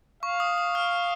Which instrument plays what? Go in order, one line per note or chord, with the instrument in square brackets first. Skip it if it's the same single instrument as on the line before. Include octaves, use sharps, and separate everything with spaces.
[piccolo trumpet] F5 [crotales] C#6
[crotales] D#6
D#6
F6